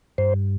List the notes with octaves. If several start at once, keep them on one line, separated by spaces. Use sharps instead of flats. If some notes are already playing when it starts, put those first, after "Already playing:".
G2 C5